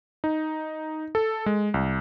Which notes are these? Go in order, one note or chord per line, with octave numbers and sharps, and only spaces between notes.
D#4
A4
G#3
C2